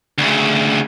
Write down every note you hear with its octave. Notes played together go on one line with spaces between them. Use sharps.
D2 C#3